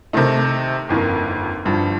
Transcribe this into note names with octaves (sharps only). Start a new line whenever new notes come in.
C3 D#3 A3 D#4
G1 F2 D#3 A#3
G1 G2 F3